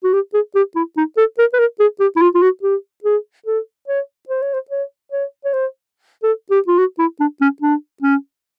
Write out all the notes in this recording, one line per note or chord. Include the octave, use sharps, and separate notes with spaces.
F#4
G4
G#4
G4
E4
D#4
A4
A#4
B4
A#4
G#4
G4
E4
F4
F4
F#4
G4
G#4
A4
C#5
C5
C#5
C5
C#5
C#5
C#5
C5
A4
G4
F4
F#4
E4
D4
C#4
D4
C#4